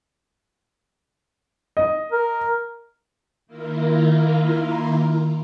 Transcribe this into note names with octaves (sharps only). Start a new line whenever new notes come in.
D#5
A#4
D#3 A#3 E4 F4 A#4